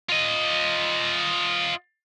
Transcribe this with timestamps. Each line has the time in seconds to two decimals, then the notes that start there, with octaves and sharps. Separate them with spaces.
0.09 F4 D#5